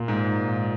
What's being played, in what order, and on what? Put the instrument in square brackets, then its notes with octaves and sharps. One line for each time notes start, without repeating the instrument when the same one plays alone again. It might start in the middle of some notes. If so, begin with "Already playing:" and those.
Already playing: [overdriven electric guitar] A#2
[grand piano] G#2